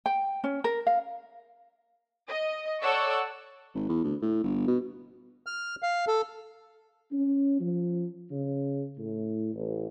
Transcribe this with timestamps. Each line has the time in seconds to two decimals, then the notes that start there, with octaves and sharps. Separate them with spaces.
0.06 G5
0.44 C#4
0.64 A#4
0.87 F5
2.28 D#5
2.82 A4 C#5 D5 F#5 C#6 E6
3.75 G#1
3.89 E2
4.04 D2
4.22 A2
4.44 G1
4.67 B2
5.46 F6
5.83 F5
6.08 A4
7.11 C#4
7.60 F3
8.31 C#3
8.98 A2
9.54 A1